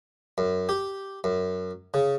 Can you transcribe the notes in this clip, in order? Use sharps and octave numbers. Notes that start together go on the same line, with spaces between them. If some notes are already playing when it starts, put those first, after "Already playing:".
F#2
G4
F#2
C#3